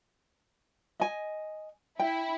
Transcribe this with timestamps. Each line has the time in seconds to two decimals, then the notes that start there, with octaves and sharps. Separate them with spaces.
1.00 D#5 G#5
1.99 E4 G5